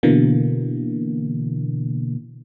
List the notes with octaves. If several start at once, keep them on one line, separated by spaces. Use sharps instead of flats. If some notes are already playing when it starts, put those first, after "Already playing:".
B2 D3 E3 A#3